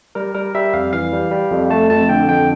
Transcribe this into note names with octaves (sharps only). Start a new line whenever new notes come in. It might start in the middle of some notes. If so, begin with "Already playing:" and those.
G3 A#4
G3 A#4
G3 E5
F2 F5
E3 F5
G3
G3
F2
A3 A5
F2 A5
D3 G5
F2 G5